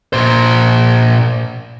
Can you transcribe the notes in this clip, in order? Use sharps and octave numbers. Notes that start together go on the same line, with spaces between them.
A#2 C5